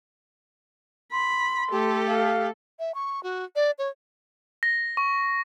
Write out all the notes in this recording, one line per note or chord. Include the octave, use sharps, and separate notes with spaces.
B5 C6
A3 G4 A4
F5
E5
C#6
F#4
D5
C#5
A#6
C#6